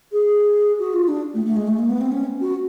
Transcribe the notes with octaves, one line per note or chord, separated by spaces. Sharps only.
G#4
F#4
F4
D4
A3
A3
G#3
A3
A#3
B3
C4
C#4
F#4